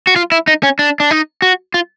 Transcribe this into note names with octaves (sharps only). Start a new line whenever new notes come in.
F#4
F4
E4
D#4
C#4
D4
D4
D#4
F#4
F4